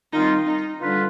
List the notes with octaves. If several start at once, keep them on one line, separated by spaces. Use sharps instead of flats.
D#3 G3 C4 D#4 F4
D#4
D3 G3 D4 F4 B4